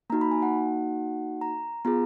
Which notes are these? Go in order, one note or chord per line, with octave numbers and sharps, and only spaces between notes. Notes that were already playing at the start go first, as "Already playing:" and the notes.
A#3 D#4 F#4 A#5
B5
G#5
F#5
A#5
B3 F4 G#4 A#5